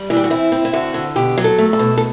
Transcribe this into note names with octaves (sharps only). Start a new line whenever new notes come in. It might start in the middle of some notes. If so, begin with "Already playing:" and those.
Already playing: G3
E3 D4
G4
F#4
C4 E4
C4
E4
D3 F#4
D3
B2 G4
F#3
A4
A3
A4
B2
A4